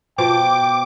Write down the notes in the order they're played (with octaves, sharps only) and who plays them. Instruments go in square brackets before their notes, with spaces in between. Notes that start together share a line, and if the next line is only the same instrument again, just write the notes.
[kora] B2 F4 C5 [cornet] G5 [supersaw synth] D6